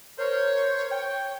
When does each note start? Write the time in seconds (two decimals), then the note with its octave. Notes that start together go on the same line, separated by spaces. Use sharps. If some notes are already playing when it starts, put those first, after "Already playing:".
0.18 A#4 C5 C#5
0.91 G5